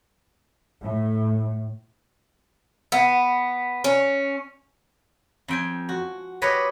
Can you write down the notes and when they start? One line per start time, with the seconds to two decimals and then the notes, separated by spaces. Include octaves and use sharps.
0.82 A2
2.92 B3
3.84 C#4
5.48 F2 G5 G#5
5.89 F#4
6.42 G4 B4 C#5 D#5